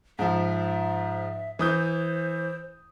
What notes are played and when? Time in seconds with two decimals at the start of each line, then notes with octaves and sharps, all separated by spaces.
0.19 G#2 F3 E5
1.59 E3 C5 D#6 G6